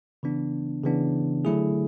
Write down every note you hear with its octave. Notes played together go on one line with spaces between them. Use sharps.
C#3 E3 B3 D4
C#3 E3 B3 D4
D3 F#3 A3 E4 G#4